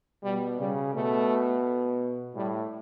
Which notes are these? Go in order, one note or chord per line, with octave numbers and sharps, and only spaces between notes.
B2 G3
C#3 G3
B2 A3
A2 G3